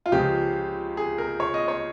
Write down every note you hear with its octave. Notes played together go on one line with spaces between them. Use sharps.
F4
C#2 C#3 F3 G#3 G4
G#4
A#4
C#5
D#5
C#5